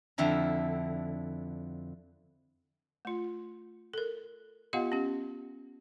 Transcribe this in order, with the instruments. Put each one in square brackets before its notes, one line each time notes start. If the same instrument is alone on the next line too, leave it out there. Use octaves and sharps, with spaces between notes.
[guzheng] F2 D3 E4 A#5
[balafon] A3 F4
A4 A#4
B3 F4 G4 D#5 F5 F#5
C#4 G4